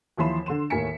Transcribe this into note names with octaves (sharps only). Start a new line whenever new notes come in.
D#2 E3 F3 B5 C6 E7
D3 C6 E7
D#2 A2 A#4 G#5 B6 C#7